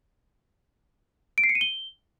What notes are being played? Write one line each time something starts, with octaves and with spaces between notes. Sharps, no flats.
D7
C7
C#7
D#7
G7